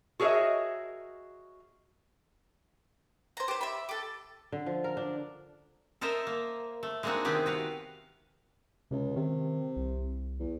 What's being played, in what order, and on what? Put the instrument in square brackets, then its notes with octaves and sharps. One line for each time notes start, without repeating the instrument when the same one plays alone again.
[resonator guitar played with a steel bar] F#4 G#4 A#4 C#5 D#5 E5
[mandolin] C5 A#5
G4 C5
E5 B5
G4 A4
[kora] D3
F3
A#4
D4
[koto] A4 A#4 C5 D#5 E5
A#3
A3
G#3 A#3 C4 D4 D#4 F#4
C3 D#3 B3 C4 G4 G#4
F#4 B4 F5
[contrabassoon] C#2 [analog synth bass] C3
[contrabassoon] C3 [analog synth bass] D#3
[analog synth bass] C2
[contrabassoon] E2